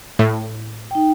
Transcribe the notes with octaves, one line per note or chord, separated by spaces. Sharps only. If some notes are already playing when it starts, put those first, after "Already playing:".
A2
D#4 G5